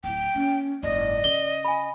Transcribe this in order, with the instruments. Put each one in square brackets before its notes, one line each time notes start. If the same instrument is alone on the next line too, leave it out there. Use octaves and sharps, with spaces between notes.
[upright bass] D1 E4 [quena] G5
[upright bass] A#3 [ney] C#4
[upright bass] F#1 G#2 [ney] D5 [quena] D#5
[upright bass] C#3 [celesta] G7
[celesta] G#5 B5